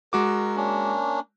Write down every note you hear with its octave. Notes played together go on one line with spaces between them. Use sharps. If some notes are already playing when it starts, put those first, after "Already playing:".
G#3 F#4 A#4 D6
A#3 C#4 D4